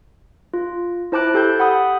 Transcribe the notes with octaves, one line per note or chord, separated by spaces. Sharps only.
F4
E4 C5 A5 D6 F#6 D7
G4 A4 A5 G6
F#5 B5 D#6